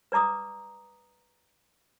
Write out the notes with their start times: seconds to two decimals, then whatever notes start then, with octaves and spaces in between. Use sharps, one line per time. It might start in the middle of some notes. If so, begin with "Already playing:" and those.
0.12 B4 D5 A#5 D6 D#6